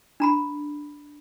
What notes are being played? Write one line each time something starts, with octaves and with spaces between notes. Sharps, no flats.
D4 A#5 B5